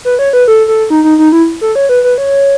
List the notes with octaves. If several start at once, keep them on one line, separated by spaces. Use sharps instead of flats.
B4
C#5
B4
A4
A4
D#4
D#4
D#4
E4
A4
C#5
B4
B4
C#5